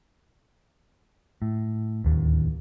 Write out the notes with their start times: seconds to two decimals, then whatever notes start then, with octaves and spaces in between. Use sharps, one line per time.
1.42 A2
2.04 D1 D#2